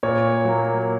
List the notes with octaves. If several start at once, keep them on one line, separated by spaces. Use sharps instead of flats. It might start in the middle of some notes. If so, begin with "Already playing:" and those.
A#2 C#5
F#3 A#3